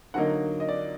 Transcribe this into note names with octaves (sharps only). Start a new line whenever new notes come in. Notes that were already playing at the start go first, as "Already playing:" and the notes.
D3 F#3 A#3 D#4 F#5
D#5
D5